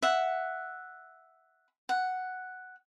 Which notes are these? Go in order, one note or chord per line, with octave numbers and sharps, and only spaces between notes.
E5 F#5
F#5